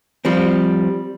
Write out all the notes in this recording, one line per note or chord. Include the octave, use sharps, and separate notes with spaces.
F3 G3 C4